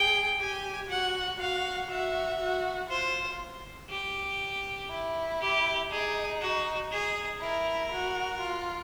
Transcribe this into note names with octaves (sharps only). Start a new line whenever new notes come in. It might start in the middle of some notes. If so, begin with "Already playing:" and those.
Already playing: G#4 G5
G4 G#5
F#4 F#5
F#4 F5
F#4 E5
F#4
F4 C5
G4
E4
G4
D#4 G#4
F#4
G#4
E4 A#4
F#4
F4